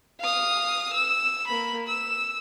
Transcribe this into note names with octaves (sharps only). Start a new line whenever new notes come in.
F5 D#6
E6
A#3 B5
E6